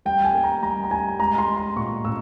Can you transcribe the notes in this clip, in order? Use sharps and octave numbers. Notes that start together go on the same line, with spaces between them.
G3 G5
G#5
A#3
A#5
G3 A#5
A#5
G3 G#5
G#3 A#5
C6
G#3
C6
A#2 C#6
A#2 E6